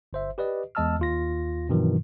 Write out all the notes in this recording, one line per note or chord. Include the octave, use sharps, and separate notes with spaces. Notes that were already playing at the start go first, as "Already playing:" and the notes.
G1 C5 E5
G4 B4 D5 D#5
E2 G#3 D#5 A5 E6 F6
D#2 F4 A#6
G2 B2 D#3 E3 F#3